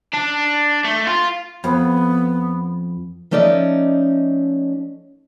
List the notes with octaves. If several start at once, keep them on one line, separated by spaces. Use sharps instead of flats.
D4
A3
F4
F2 B3 B5
F3 A3 C#4 D#4 D5 D#5